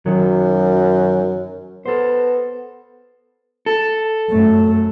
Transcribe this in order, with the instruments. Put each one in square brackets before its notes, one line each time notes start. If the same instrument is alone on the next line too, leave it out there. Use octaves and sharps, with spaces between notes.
[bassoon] F#2 [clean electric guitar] D#3 F#3
[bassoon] B3 [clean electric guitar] A4 C5
[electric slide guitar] A4
[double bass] F#2 A3